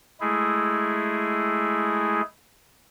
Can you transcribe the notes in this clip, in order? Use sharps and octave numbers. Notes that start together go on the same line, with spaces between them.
G#3 A3 E4 G#4